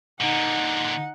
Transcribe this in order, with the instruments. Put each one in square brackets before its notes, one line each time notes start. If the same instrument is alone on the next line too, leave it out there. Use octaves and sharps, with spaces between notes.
[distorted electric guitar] A#2 D3 [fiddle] D#4 [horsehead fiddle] F#5